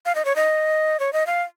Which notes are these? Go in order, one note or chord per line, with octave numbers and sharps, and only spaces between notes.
F5
D#5
C#5
D#5
C#5
D#5
F5